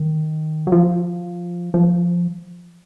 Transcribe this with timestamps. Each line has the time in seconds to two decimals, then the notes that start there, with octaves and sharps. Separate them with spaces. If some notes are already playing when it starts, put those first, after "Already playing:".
Already playing: D#3
0.67 F#3
0.72 F3
1.74 F3